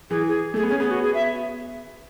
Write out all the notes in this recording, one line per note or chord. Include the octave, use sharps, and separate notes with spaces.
E3 G#4
G#4
A3 G#4
B3
C#4 G#4
B3 G#4
F#4
G#4
E5